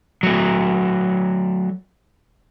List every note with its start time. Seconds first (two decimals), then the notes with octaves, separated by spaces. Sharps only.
0.23 F#3 A3